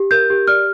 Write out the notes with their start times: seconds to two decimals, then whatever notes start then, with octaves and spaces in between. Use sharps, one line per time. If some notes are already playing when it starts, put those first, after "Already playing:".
Already playing: G4
0.11 A#4 G6
0.30 G4
0.48 D5 F6